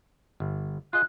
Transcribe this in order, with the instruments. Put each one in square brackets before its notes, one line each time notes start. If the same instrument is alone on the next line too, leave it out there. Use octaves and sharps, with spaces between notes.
[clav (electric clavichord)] G1
[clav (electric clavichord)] F4 G#4 D#5 [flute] F#6